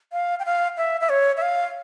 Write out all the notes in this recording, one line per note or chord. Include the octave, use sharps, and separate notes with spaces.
F5
G5
F5
E5
E5
C#5
E5
F5